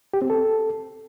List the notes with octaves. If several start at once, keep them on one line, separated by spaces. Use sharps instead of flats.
G4
C4
A4